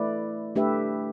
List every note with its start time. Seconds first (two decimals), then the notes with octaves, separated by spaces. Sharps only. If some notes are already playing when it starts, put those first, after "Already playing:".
Already playing: A3 E4 B4 D5
0.56 A3 D4 G4 B4 E5